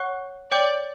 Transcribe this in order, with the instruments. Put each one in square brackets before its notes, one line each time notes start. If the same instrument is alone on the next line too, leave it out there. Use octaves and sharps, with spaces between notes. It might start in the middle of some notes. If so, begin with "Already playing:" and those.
Already playing: [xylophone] C#5 F#5 C#6 F#6
[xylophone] C#5 G5 D6 G6 [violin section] D5